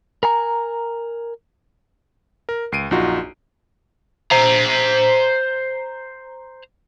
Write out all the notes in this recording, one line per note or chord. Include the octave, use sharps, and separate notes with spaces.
A#4 G#5 A#5
A#4
C#2 C7 D7 D#7
A#1 F#2 D#4 F4 F#4
C5 A#5